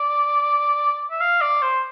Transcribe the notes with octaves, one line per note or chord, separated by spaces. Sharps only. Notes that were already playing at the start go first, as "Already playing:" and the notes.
Already playing: D5
E5
F5
D5
C5